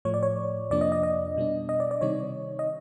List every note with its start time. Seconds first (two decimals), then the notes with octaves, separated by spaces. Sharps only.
0.05 A2 F3 A3 C#5
0.14 D5
0.23 C#5
0.70 F2 C3 F3 A#3 D4 D5
0.81 D#5
0.92 D#5
1.03 D#5
1.37 B2 G3 B3 D4
1.69 D#5
1.80 D5
1.91 D5
2.01 C3 D#3 G3 C4 D#4 C#5
2.59 D#5